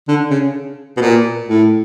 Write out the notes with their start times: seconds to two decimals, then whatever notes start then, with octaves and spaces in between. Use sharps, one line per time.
0.08 D3
0.30 C#3
0.97 B2
1.01 A#2
1.48 A2